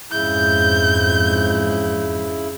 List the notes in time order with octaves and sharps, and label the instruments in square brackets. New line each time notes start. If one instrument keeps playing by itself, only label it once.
[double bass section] F2 G#2 [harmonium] C#3 E4 [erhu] G6